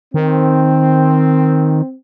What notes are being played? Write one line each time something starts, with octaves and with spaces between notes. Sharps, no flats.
D#3 C4